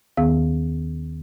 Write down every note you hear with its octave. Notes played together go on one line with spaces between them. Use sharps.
D#2 D#3 B3 G#4 F5